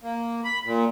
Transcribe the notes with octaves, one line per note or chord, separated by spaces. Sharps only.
A#3
B5
A#2